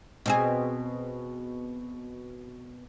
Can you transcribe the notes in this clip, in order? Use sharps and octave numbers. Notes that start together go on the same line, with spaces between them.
B2 C4 G#4